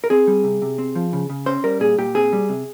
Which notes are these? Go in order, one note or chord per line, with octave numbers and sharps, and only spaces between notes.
A#4
C4 G#4
G3
C3
C3
C4
F3
C#3
C#3
C#4 C5
G3 A#4
A#2 G#4
A#2 G4
C4 G#4
G3
C3